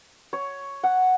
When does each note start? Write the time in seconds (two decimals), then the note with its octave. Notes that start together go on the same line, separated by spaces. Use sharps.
0.33 C#5
0.83 F#5